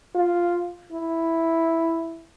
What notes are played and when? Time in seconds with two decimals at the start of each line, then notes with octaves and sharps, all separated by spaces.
0.15 F4
0.92 E4